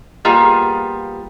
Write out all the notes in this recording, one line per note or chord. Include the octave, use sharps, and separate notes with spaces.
G3 A#3 B3 F4 G#4